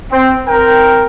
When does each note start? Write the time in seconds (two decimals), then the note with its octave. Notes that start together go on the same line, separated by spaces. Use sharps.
0.12 C4
0.48 C4 A#4 G5